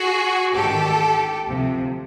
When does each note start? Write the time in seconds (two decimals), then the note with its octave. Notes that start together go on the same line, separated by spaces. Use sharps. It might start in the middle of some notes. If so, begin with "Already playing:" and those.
Already playing: F#4 G#4
0.54 A1 G#2 D#3 G4 A4
1.46 D2 C3 F3